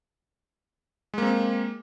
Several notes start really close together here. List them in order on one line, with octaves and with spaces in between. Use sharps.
G#3 A#3 C4